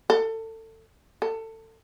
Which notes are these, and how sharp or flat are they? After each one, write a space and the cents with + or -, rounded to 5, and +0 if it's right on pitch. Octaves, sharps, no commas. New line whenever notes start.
A4 +25
A4 +25